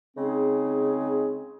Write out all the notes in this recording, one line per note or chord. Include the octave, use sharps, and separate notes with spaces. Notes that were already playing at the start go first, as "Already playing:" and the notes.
C#3 G#3 C4 D#4 G#4